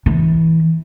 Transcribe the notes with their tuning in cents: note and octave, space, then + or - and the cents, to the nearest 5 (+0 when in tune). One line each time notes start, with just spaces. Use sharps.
E3 -20